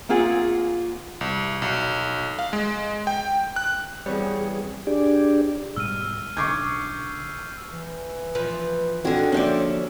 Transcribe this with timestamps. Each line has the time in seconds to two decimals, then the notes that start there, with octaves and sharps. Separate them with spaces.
0.09 A#3 C4 F4 G#4 F#5
1.21 C2
1.62 B1
2.39 F5
2.53 G#3
3.07 G5
3.56 F#6
4.06 E2 G3 B3 C4 G4 G#4 C#5
4.87 D4 G4 G#4 D5
5.76 G#2 B2 G3 E6 F6 D#7
6.37 B1 D3 C#4 C#6 D6 G6 G#6 C7
7.72 E3
8.35 F3 B4
9.05 D3 D#3 C4 F#4 G#4
9.32 D#2 F3 C#4 C5 D5 E5 C#6